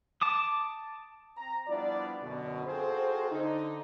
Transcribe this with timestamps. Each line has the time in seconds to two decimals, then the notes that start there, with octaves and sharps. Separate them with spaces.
0.21 A5 D6 D#6
1.37 C4 A#5
1.68 F3 G3 B3 D4 E4 D5
2.23 F#2 B2 D3
2.66 C4 F4 F#4 G#4 A4 C5
3.32 D3 D#4